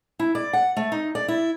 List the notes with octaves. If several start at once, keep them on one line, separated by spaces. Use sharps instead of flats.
E4
D5
F#5
A3
D#4
D5
E4